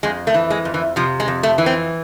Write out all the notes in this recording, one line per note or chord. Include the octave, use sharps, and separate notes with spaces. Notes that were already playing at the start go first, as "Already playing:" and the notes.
F2 G#3
A3
E3
G#3
F2
E3
C3 F3
G#3
F2
A3
E3
C4